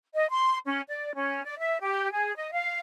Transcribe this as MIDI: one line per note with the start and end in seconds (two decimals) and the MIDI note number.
0.14 0.27 75
0.29 0.58 84
0.66 0.81 61
0.88 1.13 74
1.15 1.43 61
1.45 1.59 74
1.59 1.78 76
1.80 2.10 67
2.12 2.35 68
2.36 2.50 75
2.52 2.78 77